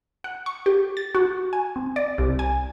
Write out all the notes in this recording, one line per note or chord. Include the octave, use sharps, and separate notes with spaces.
F#5
C#6
G4
A6
F#4
G#5
C4
D5
C2
G#5